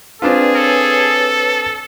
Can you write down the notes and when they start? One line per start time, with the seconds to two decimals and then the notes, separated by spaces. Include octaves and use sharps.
0.22 C4 D4 F4 G#4 B4 D5
0.56 A4 B4 C#5